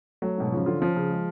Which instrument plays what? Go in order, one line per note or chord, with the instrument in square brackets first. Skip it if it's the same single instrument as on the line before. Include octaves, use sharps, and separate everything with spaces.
[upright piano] F#3 [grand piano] A3
[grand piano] G#2 [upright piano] B2
[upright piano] C#3 [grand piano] F3
[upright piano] D3 [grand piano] F4
[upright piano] F3 [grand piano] C#4
[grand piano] C#3
G#3